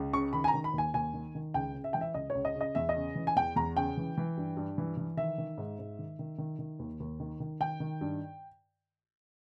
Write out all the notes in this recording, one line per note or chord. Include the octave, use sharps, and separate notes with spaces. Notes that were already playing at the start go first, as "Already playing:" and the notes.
Already playing: C#2
C#3 C#6
D#3 B5
G#5
A#5
D#3
B5
D#2 G#5
D#2 G#5
D#3
D#3
C#2 G5
C#3
E5
E3 G5
E5
C#2 D#5
C#5
C#2
D#5
C#3 D#5
E2 E5
D#5
C#3
E3
G#5
E2 G5
E2 A#5
C#3 G5
E3
E3
G2
G2
E3
E3
D#3 E5
D#3
G#2
G#2
D#3
D#3
D#3
D#3
D#2
D#2
D#3
D#3
D#3 G5
D#3
G2